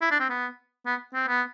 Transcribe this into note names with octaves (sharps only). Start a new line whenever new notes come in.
E4
D4
C4
B3
B3
C4
B3